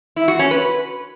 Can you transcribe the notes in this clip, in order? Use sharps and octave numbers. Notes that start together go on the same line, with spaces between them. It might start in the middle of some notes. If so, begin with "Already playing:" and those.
E4
F#4
C#4
B4